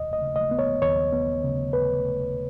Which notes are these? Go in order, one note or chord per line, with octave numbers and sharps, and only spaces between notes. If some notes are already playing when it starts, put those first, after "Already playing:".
Already playing: D#2 D#5
D#5
C#3
D#5
B3
C#5
D#2 C#5
B3
C#3
B4